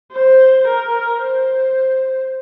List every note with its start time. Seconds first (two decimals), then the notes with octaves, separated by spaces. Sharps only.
0.12 C5
0.68 A#4
1.23 C5